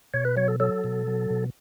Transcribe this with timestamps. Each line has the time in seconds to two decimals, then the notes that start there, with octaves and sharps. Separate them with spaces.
0.14 B2 C#5
0.25 B4
0.37 F#3 C#5
0.48 A4
0.60 F#3 A4
0.84 B2
1.07 F#3
1.30 B2